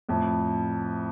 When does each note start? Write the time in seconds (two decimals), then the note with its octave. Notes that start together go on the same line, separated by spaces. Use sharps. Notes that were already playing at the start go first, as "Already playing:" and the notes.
0.09 F2 A2